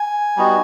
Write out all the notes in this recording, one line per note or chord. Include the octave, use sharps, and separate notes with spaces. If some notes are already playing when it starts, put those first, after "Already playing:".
Already playing: G#5
G3 B3 D#4 F#4